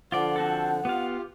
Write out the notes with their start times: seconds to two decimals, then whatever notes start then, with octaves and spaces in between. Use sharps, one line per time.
0.12 D3 F3 F4 D5 F#5
0.36 C4 F#4 A4
0.85 B3 F4 G4 F5